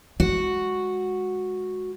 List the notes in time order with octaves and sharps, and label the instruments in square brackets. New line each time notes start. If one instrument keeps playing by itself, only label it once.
[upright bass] G#3 [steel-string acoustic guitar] F#4